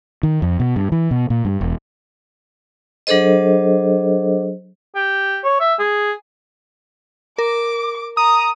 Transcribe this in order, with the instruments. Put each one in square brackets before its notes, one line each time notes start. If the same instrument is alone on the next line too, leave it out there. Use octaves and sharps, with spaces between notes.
[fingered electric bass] D#3
F2
B2
G2
E3
B2
A#2
G2
E1
[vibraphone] F#3 D4 G#4 A4 C5 D#5
[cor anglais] G4
C#5
E5
G#4
[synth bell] A#4 [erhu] D6
[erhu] A#5 [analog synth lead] D#6